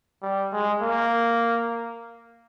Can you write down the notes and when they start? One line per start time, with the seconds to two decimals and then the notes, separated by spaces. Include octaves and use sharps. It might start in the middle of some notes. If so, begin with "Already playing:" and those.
0.22 G3
0.52 G#3
0.82 A#3